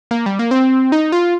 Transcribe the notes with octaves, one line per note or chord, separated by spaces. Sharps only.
A#3
G3
A#3
C4
D#4
F4